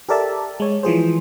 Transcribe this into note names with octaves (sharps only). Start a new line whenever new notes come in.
G4 A4 A#4 D5 E5 A5
G#3 C#5
E3 F3 G#4 C5